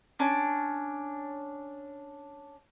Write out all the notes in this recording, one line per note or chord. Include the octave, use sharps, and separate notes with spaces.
C#4 D4